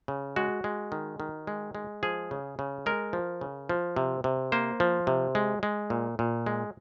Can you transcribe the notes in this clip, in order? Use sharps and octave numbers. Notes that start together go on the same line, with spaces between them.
C#3
G#3 F#4
G#3
D#3
D#3
G#3
G#3
F3 G#4
C#3
C#3
G#3 A#4
F3
C#3
F3
C3
C3
A#3 C5
F3
C3
G#3
G#3
A#2
A#2
G#3